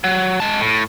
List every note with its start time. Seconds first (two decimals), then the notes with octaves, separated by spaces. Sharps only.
0.04 F#3
0.40 G#3 A5
0.61 A2